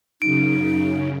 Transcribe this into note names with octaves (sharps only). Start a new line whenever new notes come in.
F#2 C#3 D#4 D7